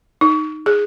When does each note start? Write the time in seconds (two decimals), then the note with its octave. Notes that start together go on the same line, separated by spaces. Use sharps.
0.21 D#4
0.66 G#4